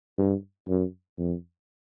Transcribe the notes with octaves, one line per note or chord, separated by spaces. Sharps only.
G2
F#2
F2